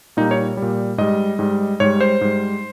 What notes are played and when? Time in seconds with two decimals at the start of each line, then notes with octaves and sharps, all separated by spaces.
0.17 A#2 G3 D#4
0.31 C#5
0.57 A#2 G3
0.98 G#2 G3 D#5
1.39 G#2 G3
1.80 G#2 G3 C#5
2.01 C5
2.21 G#2 G3